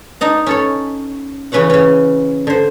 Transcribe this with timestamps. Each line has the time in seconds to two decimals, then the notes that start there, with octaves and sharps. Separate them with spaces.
0.21 D4 D#4 A#5
0.46 C#4 A4 C#5
1.52 C#3 E3 C#4 B4 C#5 F#5
1.70 C#3 C#4
2.47 D3 C5